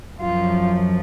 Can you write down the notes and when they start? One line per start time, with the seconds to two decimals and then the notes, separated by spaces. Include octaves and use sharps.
0.20 F#2 F3 F4